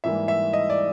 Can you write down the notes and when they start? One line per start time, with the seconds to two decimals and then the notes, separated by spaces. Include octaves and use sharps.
0.04 G#2 E3 G3 A#3 E5
0.28 E5
0.53 D#5
0.70 D5